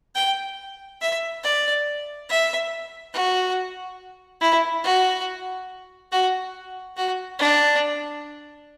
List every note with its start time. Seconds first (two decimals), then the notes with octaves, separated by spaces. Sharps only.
0.15 G5
1.01 E5
1.44 D5
2.29 E5
3.13 F#4
4.41 E4
4.84 F#4
6.12 F#4
6.97 F#4
7.39 D4